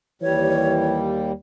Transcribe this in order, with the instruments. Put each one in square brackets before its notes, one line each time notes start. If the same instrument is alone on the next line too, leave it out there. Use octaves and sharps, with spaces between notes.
[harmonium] D#2 G3 [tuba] E3 [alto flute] C#5